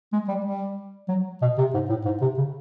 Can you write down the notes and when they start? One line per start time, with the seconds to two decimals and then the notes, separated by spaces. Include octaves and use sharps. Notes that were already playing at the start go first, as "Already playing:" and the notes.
0.13 G#3
0.28 G3
0.45 G3
1.09 F#3
1.42 B2
1.58 C3
1.74 G#2
1.90 A2
2.05 G#2
2.21 C3
2.38 C#3